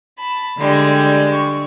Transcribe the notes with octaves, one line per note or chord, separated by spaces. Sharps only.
A5 B5
D3 G3 G#3
C#6